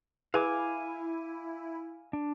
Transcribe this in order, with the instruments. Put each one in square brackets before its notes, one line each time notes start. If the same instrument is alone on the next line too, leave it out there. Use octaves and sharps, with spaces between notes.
[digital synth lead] E4 [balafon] G#4 B4 [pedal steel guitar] F5 G#5 D6
[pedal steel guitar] D4